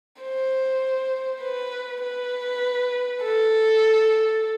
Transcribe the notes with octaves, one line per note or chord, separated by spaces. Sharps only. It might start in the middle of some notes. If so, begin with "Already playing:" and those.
C5
B4
B4
A4